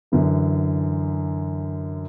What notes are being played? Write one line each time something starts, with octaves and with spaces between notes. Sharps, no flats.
F#2 D3 E3